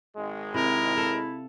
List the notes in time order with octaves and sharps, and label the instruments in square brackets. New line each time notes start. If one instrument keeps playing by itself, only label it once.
[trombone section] G#1 G#3
[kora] C3 [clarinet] E4 [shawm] A#4
[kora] A4 F5